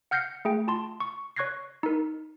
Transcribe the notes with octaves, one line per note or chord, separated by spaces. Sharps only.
F#5 F6 G6 A#6 C7 C#7
A3 G#4 G5
F4 A5 C6
C#6
C#5 C#6 F#6 G#6 A#6 C7
D#4 A#4